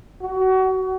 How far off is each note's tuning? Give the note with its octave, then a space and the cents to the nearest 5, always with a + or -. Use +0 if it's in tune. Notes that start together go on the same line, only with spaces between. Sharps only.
F#4 +30